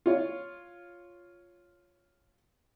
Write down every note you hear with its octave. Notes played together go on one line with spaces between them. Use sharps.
F4 C#5